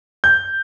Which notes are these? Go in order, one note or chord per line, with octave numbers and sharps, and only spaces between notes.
G6